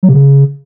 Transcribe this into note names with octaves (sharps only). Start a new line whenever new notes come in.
F#3
C3
C#3